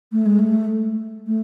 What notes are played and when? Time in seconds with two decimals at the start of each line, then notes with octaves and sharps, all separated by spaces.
0.12 A3
0.26 G#3
0.39 A3
1.27 A3